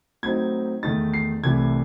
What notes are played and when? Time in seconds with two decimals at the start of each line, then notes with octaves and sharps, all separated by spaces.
0.23 A2 F#3 C4 D#4 G#6
0.83 E2 D#3 A3 D#4 A6
1.14 C7
1.44 C2 C3 E3 A3 G#6